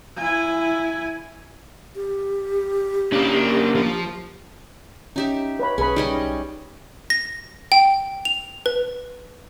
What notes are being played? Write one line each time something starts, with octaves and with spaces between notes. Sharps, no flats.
E4 G#5
G4
C#3 A#3 D4
F3
C#4 D#4 G4 E5
B4 C#5 B5
B1 C#4 G#4 B4 B5
G3 C#4 D#4 D#5
A#6
G5
F7
B4